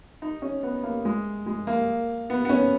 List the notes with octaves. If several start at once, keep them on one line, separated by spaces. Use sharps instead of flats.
D#4
C#4
B3
A#3
G#3
G#3
A#3
B3
B3
C#4